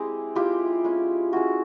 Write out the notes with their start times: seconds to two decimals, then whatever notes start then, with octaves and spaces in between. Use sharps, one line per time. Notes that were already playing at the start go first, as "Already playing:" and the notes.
Already playing: G#3 C4 E4 G4
0.35 G#3 C4 E4 F4 G4
0.84 G#3 C#4 E4
1.32 G#3 C#4 E4 F#4